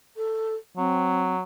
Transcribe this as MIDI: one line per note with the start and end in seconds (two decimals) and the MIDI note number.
0.16 0.54 69
0.77 1.42 54
0.77 1.33 60